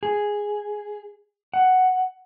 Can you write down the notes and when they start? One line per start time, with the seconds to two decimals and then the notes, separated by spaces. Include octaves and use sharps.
0.03 G#4
1.54 F#5